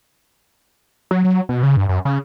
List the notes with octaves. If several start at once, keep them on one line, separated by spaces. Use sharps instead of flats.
F#3
F#3
B2
C#3
G2
F#2
C#3